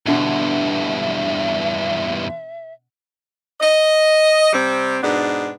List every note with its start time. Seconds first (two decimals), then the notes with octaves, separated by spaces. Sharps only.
0.06 E2 G2 B2 D3 E5
3.60 D#5
4.53 C3 G3 C4
5.01 G#2 B2 B3 D4